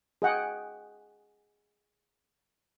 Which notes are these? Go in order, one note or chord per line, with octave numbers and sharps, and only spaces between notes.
G#4 D#5 F#5 G5